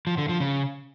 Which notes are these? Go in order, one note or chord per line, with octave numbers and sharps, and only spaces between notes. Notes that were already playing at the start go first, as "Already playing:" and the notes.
F3
D3
F3
C#3